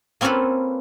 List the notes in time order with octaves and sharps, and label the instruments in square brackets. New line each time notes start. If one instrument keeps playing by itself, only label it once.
[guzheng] A#3 C4 C#4 F4 A4 B4